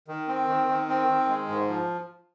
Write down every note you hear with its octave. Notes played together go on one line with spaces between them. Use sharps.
D#3
C4
D#3
D#3
C4
D#3
G#3
G#2
F3